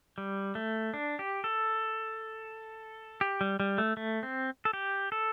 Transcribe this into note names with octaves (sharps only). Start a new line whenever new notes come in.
G3
A3
D4
G4
A4
G4
G3
G3
A3
A3
C4
A4
G4
A4